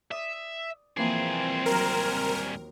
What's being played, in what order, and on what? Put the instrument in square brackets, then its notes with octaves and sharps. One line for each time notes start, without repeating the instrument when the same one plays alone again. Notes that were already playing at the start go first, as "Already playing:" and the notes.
[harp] D5 D#6 [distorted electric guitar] E5
[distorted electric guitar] C2 G#4 [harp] E3 F3 A#3 [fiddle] C4
[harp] D#2 F#3 [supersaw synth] A#4